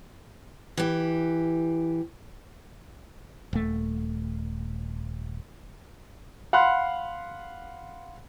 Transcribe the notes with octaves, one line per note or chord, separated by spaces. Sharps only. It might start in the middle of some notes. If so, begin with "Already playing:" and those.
E3 G4
D#1 A3
F5 F#5 B5 C6 F#6